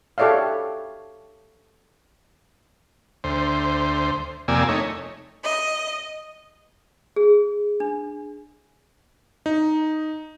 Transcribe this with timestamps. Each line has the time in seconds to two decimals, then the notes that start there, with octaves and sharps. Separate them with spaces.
0.18 G4 A4 C#5 D5 E5 F5
3.24 D2 C5
4.48 F2 C3 A#3 D5 G#5 E6
4.69 A3 D#4 C#5
5.43 D#5
7.16 G#4
7.80 D4
9.46 D#4